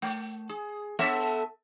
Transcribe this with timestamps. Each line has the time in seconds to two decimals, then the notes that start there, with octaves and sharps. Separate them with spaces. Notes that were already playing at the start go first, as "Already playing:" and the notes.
0.02 A3
0.49 G#4
0.99 B3 A4 E5